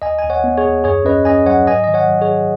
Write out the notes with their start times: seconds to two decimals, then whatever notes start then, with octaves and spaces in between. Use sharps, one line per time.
0.02 D#2 D#5 G#5
0.19 D#2 G#5
0.30 C#5 F#5
0.44 B3
0.57 G#4 C#5
0.65 D#2
0.84 F#2 G#4 C#5
1.05 C#4 B4 D#5
1.25 C#4 D#5 G#5
1.46 F#3 C#5 F#5
1.67 G#2 D#5 G#5
1.84 D#3 D#5
1.94 C#5 F#5
2.08 F#3
2.21 G#4 C#5
2.29 F#3